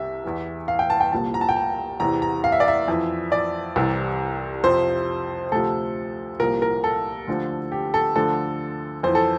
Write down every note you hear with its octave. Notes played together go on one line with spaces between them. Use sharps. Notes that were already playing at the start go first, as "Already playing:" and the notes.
Already playing: C2 C3 E5
E2 E3
F5
G5
A5
G5
C2 A#2 F3 A5
A#5
A5
G5
A5
E2 C3 E3 A#5
A#5
F5
E5
D5
E5
F2 E3
D5
C2 C3 E3
F2 C3 F3 C5
D2 C3 F3 A4
C2 A#2 F3 A#4
A#4
A4
D2 D3 F3
G4
A4
D2 D3 F3 A4
F2 E3 C5
A4